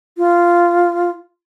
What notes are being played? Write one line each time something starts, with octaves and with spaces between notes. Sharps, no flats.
F4